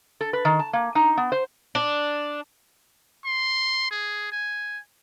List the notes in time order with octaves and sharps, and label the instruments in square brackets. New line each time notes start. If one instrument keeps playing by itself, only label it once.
[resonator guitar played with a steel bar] A4
B4
D#3
A5
A#3
D#4
B3
C5
[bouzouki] D4
[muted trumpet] C6
G#4
G#5